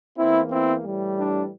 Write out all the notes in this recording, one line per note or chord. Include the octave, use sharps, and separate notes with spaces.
E2 E3 A#3 C4 E4
C4 E4
A2 E3 G3
D4